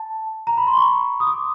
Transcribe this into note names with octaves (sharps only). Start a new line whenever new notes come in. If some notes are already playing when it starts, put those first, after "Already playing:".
Already playing: A5
A#5
B5
C6
C#6
D#6
D6